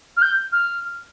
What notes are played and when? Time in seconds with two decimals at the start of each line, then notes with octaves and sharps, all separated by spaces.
0.17 F6
0.22 G6
0.52 F6